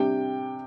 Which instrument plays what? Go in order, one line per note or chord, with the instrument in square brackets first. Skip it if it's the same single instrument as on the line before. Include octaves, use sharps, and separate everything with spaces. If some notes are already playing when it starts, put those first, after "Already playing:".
Already playing: [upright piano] C3 G3 D4 G5